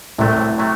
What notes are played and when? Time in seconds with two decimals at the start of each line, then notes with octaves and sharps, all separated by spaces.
0.18 C2 A2 C3 F#3 A3
0.58 C3 F#3 A3